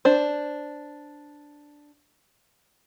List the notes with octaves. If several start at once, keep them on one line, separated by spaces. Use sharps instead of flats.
D4 C5